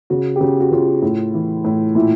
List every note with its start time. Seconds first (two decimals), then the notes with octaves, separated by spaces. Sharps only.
0.10 C#3 F#4
0.36 G4
0.41 C#3 F#4
0.60 F#4
0.71 C#3 F4
1.02 A2
1.34 E3
1.64 A2
1.95 A#2 E4